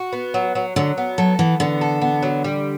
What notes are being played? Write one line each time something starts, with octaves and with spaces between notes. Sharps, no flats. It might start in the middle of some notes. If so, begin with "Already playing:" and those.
Already playing: F#4
B3
F#3
F#3
D3 F#3
B3
F#3 A4
E3 B3
D3 B3
A4
B3
F#3
G3